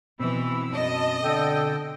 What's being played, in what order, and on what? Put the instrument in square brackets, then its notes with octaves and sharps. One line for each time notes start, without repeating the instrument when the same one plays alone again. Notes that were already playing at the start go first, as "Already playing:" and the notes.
[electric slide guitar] B2 C4 [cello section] E3 [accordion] B5 E6
[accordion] F#2 A5 [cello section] D#5
[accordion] D3 A4 G5